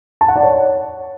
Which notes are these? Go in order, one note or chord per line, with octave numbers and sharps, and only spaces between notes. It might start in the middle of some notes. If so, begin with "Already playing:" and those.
A5
F#5
D5
C#5